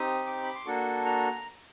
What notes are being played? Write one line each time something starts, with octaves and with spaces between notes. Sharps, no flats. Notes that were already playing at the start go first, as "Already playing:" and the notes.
Already playing: C4 D#4 G4 D#6
D6
B5
C6
A#3 D4 F#4 A4 C#6
A#5